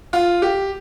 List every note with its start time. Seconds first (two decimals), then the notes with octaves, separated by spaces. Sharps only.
0.13 F4
0.42 G4